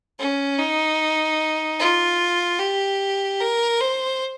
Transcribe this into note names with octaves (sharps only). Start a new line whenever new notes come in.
C#4
D#4
F4
G4
A#4
C5